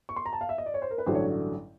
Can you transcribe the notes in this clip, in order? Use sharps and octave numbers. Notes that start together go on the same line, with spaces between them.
C#6
C6
A#5
A5
F5
E5
D#5
D5
C#5
C5
A#4
B4
A1 G2 D3 F#3 A3 C5
C#5